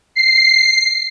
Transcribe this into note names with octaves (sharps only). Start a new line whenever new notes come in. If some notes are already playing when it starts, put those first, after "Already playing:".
C7